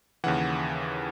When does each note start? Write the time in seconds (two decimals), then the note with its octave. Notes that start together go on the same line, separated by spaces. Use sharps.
0.24 D#2 C#3 E3 F#5